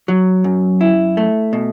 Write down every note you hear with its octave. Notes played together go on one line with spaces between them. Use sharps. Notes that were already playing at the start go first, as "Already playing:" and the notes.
F#3
F#2
E4
A3
B2